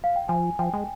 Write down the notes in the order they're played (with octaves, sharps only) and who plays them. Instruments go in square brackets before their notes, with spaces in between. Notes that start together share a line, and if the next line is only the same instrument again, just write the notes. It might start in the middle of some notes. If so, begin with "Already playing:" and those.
[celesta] F5
G5
[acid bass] F3 [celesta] G#5
[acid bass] F3 [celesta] G5
[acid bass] G#3